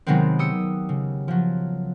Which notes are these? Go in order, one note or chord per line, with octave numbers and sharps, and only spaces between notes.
C3 D#3 F#3 G#3 B3 C4
G4 D#6 E6 C#7
C#3
F3 F#3